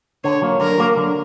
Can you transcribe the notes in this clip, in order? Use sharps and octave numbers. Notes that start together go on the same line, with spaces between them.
D3 C#5
F#3 A#3
D3 A#4
F#3 A#3
D3